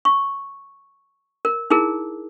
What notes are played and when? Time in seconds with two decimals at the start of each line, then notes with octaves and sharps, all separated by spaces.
0.05 C#6
1.45 A#4
1.70 D#4 E4 G#4 A#4